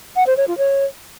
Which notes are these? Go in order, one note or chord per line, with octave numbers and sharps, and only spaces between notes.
F#5
C5
C#5
F4
C#5